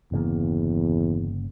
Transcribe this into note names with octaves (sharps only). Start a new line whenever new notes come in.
G1 E2 C#3 A#3